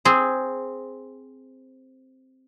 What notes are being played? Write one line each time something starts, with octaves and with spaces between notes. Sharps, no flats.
C4 G#4